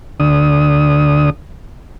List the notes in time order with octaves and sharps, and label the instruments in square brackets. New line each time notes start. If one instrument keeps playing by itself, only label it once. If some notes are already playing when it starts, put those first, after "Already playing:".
[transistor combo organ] D2 D3 D#6